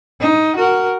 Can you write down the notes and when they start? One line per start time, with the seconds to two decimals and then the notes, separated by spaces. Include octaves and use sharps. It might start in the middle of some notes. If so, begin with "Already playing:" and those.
0.20 D#4
0.56 F#4 A#4